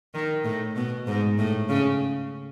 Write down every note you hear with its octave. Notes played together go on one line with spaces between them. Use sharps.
D#3
A2
B2
G#2
A2
C#3